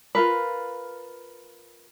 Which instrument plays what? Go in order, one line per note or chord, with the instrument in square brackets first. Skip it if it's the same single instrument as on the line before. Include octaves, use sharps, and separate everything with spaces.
[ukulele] F4 A#4 B4